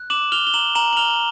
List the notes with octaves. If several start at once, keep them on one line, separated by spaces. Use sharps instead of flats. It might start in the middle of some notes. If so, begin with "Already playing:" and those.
Already playing: F#6
D6 E7 F#7
F6 F7 G7
G7
A#5 E7 F#7
A#5 E7 F#7
F#7
F6 F7 G7